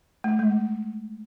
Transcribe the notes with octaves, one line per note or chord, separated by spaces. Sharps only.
A3
G#3